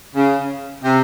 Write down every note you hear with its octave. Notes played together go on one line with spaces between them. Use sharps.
C#3
C3